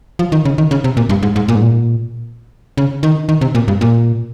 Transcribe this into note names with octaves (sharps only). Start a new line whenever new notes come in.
F3
D#3
C#3
D#3
C#3
C3
A#2
G2
G#2
G#2
A#2
G#2
A#2
C#3
D#3
D#3
C3
A#2
G2
A#2